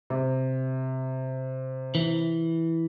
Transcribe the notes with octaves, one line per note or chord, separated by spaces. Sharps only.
C3
E3